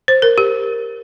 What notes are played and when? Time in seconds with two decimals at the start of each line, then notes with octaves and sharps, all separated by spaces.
0.08 C5
0.22 A#4
0.38 G4